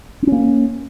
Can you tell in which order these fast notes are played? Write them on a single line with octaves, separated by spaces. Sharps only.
C4 C#4 A#3